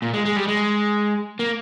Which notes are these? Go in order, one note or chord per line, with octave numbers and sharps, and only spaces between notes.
A#2
G#3
G#3
G3
G#3
A#3